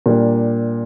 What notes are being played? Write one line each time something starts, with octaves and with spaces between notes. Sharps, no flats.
A#2 G3 A#3 D4